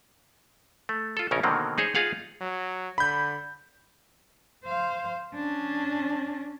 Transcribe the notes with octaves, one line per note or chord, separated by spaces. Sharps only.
A3
F4 A4
A#1 C#3 C#4 A#4
B2 D3 D#3 F#3 A#3 C4
D#4 G#4 C5 C#5
D#4 F4 G#4 F5 F#5
F#3
D3 B5 G6
C5 F5
C#4 D4